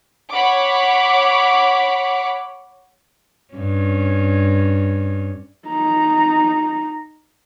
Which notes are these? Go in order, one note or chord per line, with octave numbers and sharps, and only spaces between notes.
C#5 F#5 B5 D6
G2 C#4
D#4 A#5